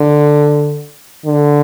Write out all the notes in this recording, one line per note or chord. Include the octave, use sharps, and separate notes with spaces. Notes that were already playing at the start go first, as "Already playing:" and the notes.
Already playing: D3
D3